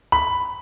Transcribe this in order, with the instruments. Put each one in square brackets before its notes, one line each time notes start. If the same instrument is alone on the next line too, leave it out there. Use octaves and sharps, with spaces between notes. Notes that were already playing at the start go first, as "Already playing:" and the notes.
[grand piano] B5